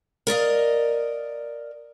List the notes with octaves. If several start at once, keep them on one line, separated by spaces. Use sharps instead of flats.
A#4 D5 D#5 F5